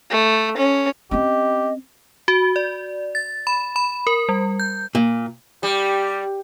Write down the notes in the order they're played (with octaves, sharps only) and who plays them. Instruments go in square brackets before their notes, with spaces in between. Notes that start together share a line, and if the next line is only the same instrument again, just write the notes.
[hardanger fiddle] A3
C#4
[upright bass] C4 C#4 [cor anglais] G4 [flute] D#5
[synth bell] F#4
D5
A6
B5
B5
A#4
G3
G6
[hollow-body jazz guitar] A#2
[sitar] G3 [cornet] G4